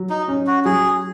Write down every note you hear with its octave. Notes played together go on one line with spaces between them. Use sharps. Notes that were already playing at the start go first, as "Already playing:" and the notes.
Already playing: F#3
D#4
C#4
F#4
F#3 G#4